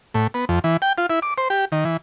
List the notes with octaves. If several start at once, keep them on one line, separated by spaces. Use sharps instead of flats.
A2
B3
F2
E3
G5
F4
E4
D6
C5
G4
D#3
E3